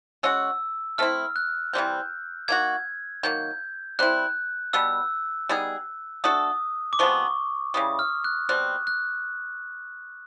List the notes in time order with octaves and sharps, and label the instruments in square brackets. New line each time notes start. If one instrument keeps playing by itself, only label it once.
[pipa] G#3 C#4 F#4 [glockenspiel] E6
[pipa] A3 C4 E4 [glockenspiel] F6
[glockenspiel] F#6
[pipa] C3 E3 G3 C4 [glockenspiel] G6
[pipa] A#3 D#4 F#4 [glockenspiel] G#6
[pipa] D#3 F#3 A#3 [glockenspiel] G6
[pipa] G3 C4 E4 [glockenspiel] F#6
[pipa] B2 G3 B3 [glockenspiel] E6
[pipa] G3 B3 D#4 G#4
[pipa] A3 D4 F#4 A4 [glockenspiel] D#6
[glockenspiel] D6
[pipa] C3 F3 G#3 B3 [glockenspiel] C#6
[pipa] C#3 E3 G3 [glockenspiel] D#6
[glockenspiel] F6
F#6
[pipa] B2 G3 C4 [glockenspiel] F#6
[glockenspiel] F#6